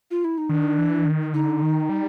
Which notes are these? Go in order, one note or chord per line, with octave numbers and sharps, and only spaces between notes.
F4
E4
D#4
D#3 D4
E3
D#3
D3 D#4
D#3
G3